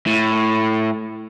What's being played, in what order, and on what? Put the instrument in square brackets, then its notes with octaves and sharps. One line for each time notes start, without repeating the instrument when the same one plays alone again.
[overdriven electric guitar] A2